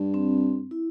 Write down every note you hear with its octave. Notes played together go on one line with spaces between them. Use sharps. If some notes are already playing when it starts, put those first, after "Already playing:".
Already playing: G2
C4
E4